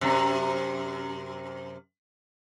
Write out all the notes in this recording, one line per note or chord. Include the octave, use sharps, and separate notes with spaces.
F#2 C3